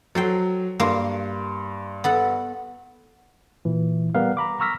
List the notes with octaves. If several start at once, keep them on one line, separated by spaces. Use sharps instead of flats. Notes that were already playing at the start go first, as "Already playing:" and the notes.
F#3 A4 C5 G5
G2 A#3 C6
B3 A4 F#5
A#2 E3
G3 B3 A#4 B4 F5
A#5 B5 D6
A#5 C#6 E6 F6 A#6 B6